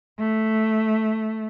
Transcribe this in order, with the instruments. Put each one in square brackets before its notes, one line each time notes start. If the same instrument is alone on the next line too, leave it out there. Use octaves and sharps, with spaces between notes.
[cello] A3